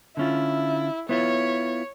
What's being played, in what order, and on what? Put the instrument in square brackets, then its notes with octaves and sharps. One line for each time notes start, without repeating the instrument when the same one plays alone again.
[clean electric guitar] D3 C#4 F4 [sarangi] E4
[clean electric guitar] B3 E4 F4 [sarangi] C#5